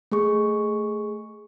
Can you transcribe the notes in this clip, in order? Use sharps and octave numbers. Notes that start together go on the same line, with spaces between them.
A3 G#4 C#6